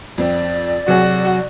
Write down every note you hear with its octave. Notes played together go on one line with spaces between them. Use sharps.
F2 C4 D5
C3 F#3 F#4 G#4